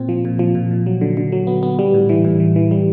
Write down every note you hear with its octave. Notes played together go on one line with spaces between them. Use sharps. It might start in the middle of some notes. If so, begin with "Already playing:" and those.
Already playing: A#2 C4
F3
A#2
F3
A#2
A#2
F#3
D3
D3
F#3
B3
B3
G3
A2
E3
A2
E3
E3
G3